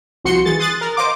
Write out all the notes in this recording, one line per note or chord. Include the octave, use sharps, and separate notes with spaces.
C2 F3 F#4 C6 C#7
E3 G#4 A6
C6 D#6 F#6 A6
A#4
C5 D#5 F5 D6